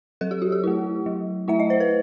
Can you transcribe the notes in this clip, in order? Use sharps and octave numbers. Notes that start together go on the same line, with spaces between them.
F#3 A4
G4
F#4
G4
A3 E4
F#3
A3 E4 E5
D#5
C5
B4